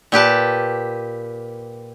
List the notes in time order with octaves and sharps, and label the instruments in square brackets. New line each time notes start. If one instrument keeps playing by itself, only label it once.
[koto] A#2 G4 B4 A5